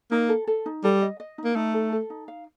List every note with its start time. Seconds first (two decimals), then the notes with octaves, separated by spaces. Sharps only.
0.11 A#3 D#4
0.29 A4
0.47 A4
0.66 D#4
0.84 G3 A4
1.02 D#5
1.20 D#5
1.38 D#4
1.44 A#3
1.56 A3 D#4
1.74 A4
1.92 A4
2.10 D#4
2.28 F5